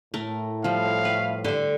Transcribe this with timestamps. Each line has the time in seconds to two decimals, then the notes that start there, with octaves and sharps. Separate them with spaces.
0.14 A2 A3 A#4
0.64 F3 G3 F5
1.05 B4
1.45 D3 G4 C5